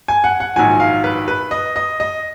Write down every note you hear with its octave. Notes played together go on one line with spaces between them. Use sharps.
G#5
F#5
F#5
A#1 G#2 D#3 F#3 G#5
F5
B4
B4
D#5
D#5
D#5